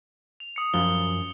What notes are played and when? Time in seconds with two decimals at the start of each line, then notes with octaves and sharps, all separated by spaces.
0.40 F7
0.56 D#6 C#7
0.74 F#2 F3 G7